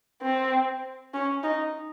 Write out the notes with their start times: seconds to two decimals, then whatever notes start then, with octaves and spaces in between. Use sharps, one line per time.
0.22 C4
1.14 C#4
1.43 D#4